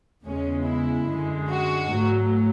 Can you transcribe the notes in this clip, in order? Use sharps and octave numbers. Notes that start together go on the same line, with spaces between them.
E2 C#3 G#3 C#4
E4
F#2 D3 G#3
F#4
G#2 F#3 A3